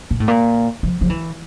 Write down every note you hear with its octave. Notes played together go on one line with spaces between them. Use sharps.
A#2
A2
A#2
F3
F3
E3